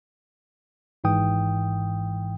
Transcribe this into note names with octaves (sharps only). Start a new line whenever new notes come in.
G#1 G#2 E3 G5 D#6